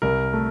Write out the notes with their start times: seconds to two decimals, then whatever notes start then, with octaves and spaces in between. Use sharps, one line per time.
0.02 C2 A#4
0.33 A3